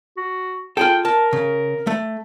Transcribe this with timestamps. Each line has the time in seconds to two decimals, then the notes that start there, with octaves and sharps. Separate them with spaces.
0.17 F#4
0.77 F4 G#4 A4 G5
1.05 A#4 A5
1.33 C#3
1.87 A3